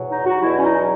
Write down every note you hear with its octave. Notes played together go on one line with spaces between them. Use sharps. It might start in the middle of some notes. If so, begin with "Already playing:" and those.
Already playing: E2 B2 F#3
D#4
F#4
E2 B2 F#3 E4
C#4
D#4